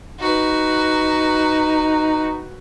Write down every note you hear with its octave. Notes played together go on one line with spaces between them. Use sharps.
D#4 F#4 B4